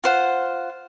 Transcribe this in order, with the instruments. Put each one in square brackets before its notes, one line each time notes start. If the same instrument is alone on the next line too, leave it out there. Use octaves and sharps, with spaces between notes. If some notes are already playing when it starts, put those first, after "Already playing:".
[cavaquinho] F4 C5 F#5